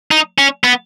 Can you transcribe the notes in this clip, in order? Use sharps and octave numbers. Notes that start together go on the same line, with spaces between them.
D#4
C#4
B3